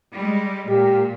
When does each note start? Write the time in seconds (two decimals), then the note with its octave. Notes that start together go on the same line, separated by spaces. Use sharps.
0.12 G3 G#3
0.68 A#2 G4